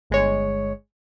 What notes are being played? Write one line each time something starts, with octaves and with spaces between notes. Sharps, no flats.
G1 G#3 C#5